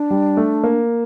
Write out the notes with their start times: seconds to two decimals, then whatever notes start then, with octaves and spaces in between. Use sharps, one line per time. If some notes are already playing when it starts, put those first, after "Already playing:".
Already playing: D4
0.11 G3
0.37 A3
0.64 A#3